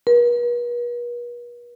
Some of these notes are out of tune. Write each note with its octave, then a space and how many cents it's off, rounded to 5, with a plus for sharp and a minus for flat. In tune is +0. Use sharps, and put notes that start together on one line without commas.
B4 -45